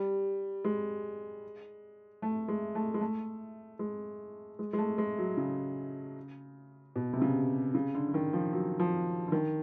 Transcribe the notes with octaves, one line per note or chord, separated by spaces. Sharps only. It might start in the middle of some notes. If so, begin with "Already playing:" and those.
Already playing: G3
G#3
A3
G#3
A3
G#3
A3
G#3
G#3
G#3
A3
G#3
F#3
C#3
B2
C3
C#3
C#3
D3
D3
D#3
F3
F#3
F3
D3
D#3